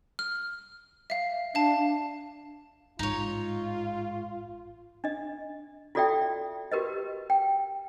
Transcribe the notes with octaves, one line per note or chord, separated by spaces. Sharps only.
F6
E5 F5
D4 F5 A5
A1 G#2 D#4 F4 C#5
D4 D#5
F4 F#4 A4 D5 E5 G5
F#4 G4 A#4 B4 D#5
G5